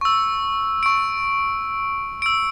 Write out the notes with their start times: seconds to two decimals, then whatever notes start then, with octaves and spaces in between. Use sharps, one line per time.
0.01 C#6 E6
0.83 C#6 D7
2.22 E6 D7